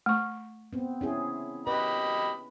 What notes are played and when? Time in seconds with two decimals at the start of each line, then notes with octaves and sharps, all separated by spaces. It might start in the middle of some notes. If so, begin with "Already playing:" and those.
0.06 A3 C#6
0.73 B3 C4
1.01 C#4 E4 G#4
1.67 G4 B4 D#5 B5